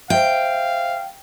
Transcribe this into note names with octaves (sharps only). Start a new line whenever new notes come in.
C5 E5 F5 G5